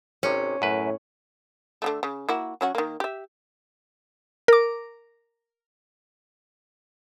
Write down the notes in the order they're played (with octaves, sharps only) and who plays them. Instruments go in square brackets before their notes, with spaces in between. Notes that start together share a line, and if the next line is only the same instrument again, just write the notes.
[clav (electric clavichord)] G#1 C3 [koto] C#4
[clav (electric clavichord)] F#2 B4 [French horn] A2
[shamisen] D3 G#3 A3
C#3
A#3 E4 F#4
F#3 C#4 F#4
D#3 A#3
G4 E5
[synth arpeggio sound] A#4 D6